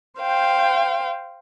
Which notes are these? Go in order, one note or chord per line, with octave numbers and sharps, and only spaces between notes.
C5 F5 G5